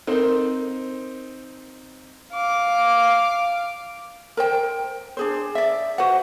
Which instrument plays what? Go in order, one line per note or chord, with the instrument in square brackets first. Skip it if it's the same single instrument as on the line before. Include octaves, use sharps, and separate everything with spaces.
[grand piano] C4 D#4 C5 [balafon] A4 A#4
[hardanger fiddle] F5 D6
[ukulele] A#4 C5 G5
D4 G#4 C5
D5 E5
F#4 B4 C5 F#5